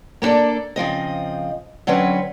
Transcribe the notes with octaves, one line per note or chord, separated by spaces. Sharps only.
A#3 B3 D4 A4 D5
C#3 F3 C4 D#5
D3 F#3 C4 C#4 B4